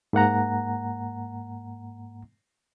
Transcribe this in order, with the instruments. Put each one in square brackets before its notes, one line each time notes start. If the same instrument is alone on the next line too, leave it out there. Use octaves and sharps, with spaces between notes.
[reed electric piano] G#2 A#3 F#5 A#5